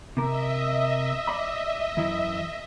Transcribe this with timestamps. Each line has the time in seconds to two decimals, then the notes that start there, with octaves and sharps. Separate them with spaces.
0.17 C3 A#4 D#5 E5
1.27 D5 B5
1.97 F#2 E3